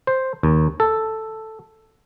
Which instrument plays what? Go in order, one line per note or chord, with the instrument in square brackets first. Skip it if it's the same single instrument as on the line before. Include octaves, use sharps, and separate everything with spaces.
[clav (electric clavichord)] C5
D#2
A4